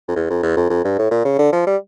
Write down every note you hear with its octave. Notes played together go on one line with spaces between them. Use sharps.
F2
E2
F2
E2
F2
F2
G2
A2
A#2
C#3
D3
F3
G3